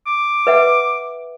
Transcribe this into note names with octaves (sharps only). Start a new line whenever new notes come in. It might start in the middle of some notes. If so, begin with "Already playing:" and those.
D6
B4 E5 F#5